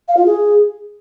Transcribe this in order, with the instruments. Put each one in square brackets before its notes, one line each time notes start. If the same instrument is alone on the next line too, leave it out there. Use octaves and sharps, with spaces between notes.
[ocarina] F5
F4
G#4